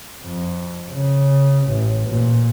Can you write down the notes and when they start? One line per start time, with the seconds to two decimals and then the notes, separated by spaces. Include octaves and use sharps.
0.23 F2
0.91 C#3
1.67 A1
2.08 A#2